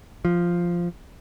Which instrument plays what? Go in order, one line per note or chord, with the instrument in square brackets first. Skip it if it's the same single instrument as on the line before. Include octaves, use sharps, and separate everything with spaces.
[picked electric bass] F3